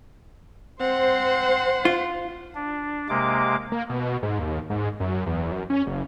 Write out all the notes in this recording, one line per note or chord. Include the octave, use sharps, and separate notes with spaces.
C4 C5 F#5
F4
D4
C3 G#3 A#3 D6
A#3
B2
G#2
D#2
G#2
F#2
E2
F#2
C#4
F#1